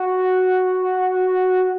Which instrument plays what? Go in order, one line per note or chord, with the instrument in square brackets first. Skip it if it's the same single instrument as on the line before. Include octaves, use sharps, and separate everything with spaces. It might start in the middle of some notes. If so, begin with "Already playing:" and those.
Already playing: [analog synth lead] F#4